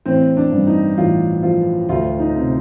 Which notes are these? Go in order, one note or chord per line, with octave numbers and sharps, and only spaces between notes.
A1 C4
D4
G2
D#4
A1 F4
F3 F4
D2 F4
D#4
C3